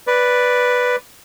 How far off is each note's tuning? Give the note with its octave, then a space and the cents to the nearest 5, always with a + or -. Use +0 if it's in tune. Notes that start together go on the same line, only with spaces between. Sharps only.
B4 +0 D5 +0